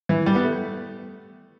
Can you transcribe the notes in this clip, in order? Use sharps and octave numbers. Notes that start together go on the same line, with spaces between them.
E3
G3
B3
A3